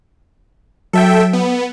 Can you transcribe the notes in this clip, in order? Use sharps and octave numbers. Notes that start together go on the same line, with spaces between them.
F#3 A4 E5 G5
B3